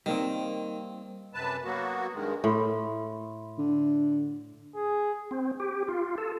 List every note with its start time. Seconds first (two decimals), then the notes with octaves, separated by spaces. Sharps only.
0.06 D#3 G3 A#3 C4
1.34 F#2 C3 B4 A5
1.64 F#3 A#3 B3 F#4
2.14 G2 D#3 G#3
2.44 A2 E5 B5 C6
3.58 D3
4.75 G#4
5.31 C4
5.60 G4
5.88 F4
6.18 A4